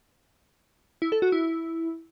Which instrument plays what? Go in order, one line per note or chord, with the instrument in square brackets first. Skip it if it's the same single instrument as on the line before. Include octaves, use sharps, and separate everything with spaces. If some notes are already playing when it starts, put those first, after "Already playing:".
[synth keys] E4
A4
F#4
E4